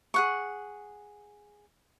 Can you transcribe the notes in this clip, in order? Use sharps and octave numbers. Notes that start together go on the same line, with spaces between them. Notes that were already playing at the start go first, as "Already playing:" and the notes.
G#4 F#5 C#6